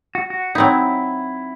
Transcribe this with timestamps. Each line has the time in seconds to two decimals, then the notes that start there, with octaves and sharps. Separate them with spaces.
0.15 F#4
0.30 F#4
0.55 F#3 C4 D#4 E4